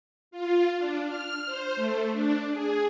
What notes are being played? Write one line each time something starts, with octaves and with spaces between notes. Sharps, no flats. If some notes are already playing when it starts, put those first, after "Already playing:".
F4
D4
F6
C5
A3
D4
G#4